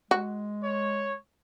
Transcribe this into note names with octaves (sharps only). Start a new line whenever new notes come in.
G#3 F#4
C#5